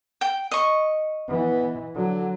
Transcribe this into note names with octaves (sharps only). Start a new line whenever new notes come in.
G5
D#5 C#6
E3 B3
D3 F#3